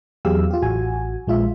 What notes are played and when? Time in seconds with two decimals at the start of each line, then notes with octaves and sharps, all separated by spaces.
0.25 E2 F#3 G4 G#4 F5 E6
0.51 F4 G4
0.62 A1 F#4 G#5
1.27 A#1 G#3 F4 E5